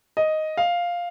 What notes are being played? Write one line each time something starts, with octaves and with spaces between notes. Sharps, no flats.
D#5
F5